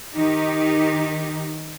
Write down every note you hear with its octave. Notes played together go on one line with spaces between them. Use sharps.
D#3 D#4 G4